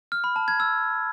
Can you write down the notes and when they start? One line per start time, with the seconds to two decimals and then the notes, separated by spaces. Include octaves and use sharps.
0.12 F6
0.24 B5
0.36 A5
0.48 G#6
0.60 E6